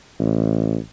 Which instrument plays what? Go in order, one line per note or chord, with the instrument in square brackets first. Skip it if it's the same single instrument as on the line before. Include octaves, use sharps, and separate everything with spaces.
[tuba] A1